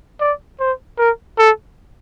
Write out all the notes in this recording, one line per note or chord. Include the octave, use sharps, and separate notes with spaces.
D5
C5
A#4
A4